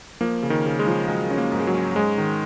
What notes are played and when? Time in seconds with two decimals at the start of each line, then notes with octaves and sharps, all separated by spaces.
0.21 F3 A#3
0.43 C#3
0.50 D#3
0.66 C#3
0.79 G#3
0.87 F3
1.08 F#3 G#3
1.30 C#4
1.38 A#3
1.52 G#2
1.60 G#3
1.67 F#3
1.75 C#4
1.96 G#2 G#3
2.18 D#3